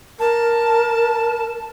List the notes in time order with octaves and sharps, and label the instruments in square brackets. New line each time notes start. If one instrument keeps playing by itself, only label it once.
[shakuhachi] A#4 [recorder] A5